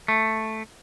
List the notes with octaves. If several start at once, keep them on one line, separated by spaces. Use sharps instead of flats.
A3